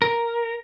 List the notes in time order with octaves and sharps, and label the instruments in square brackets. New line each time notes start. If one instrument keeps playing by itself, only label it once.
[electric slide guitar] A#4